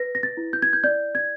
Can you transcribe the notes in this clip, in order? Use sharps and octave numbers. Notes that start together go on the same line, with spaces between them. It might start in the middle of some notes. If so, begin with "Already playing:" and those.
Already playing: B4 A#6
A#6
A6
E4
G6
G#6
G6
D5 G6
G#6